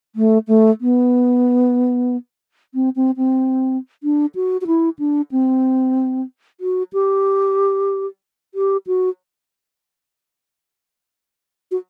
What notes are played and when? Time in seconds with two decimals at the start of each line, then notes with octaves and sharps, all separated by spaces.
0.15 A3
0.48 A3
0.81 B3
2.74 C4
2.96 C4
3.17 C4
4.03 D4
4.35 F#4
4.61 F#4
4.67 E4
4.99 D4
5.31 C4
6.60 F#4
6.93 G4
8.54 G4
8.87 F#4
11.71 F#4